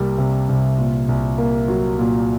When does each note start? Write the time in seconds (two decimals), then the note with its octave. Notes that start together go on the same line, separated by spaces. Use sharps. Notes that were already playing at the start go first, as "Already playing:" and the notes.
Already playing: C2 C3 G3 A#3
0.18 C3
0.49 C2
0.78 A#2
1.09 C2
1.38 A#3
1.68 F#3
1.99 A#2